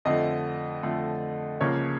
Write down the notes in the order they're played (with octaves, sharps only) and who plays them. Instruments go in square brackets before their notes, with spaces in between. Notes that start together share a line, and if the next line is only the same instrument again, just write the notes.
[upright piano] F2 D3 F3 A3 D#5
F2 D3 F3 A3
C#2 C#3 F3 A#3 C#5